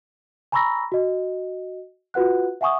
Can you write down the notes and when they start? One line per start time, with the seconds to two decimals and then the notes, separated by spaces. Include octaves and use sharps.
0.52 G#5 A#5 B5 C#6 E6 A#6
0.92 F#4 D#5
2.14 F4 F#4 B4 F#5 F#6
2.61 E5 F#5 G#5 C#6 D#6